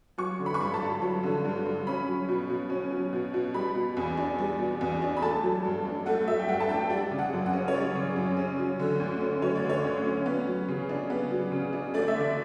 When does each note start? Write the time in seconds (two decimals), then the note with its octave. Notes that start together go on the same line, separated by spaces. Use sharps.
0.18 F#3 C#6
0.39 D3
0.46 B5
0.54 C#6
0.61 G2 B5
0.74 A5
0.82 G2
1.02 F#3
1.23 D3
1.44 G2
1.66 G2
1.87 C#4 B5
2.08 F#3
2.28 B2
2.50 B2
2.70 C#4
2.91 F#3
3.13 B2
3.34 B2
3.54 G3 B5
3.75 B2
3.97 E2
4.17 D4
4.38 G3
4.59 B2
4.81 E2
5.02 D4
5.17 B5
5.22 A3 A5
5.43 F#3
5.64 G2
5.85 D4
6.06 A3 F#5
6.27 F#3 E5
6.39 G5
6.48 G2 F#5
6.60 A5
6.69 D4 G5
6.90 G3 D5
7.11 C#3
7.19 F#5
7.33 F#2
7.46 F#5
7.53 C#4
7.68 C#5
7.74 G3 D5
7.95 C#3
8.16 F#2
8.37 C#4
8.59 F#3
8.79 D3
9.00 D2
9.21 C#4
9.42 F#3 C#5
9.55 D5
9.64 D3
9.69 C#5
9.84 D2
10.05 C#4
10.26 B3
10.47 F#3
10.68 C#3
10.89 D4
11.10 B3
11.31 F#3
11.52 C#3
11.73 D4
11.94 A3 D5
12.08 E5
12.15 D3
12.21 D5